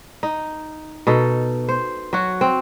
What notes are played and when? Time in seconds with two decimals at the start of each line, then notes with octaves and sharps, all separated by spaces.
0.23 D#4
1.07 B2 D#4 A4
1.69 C5
2.13 F#3 F#4
2.41 C4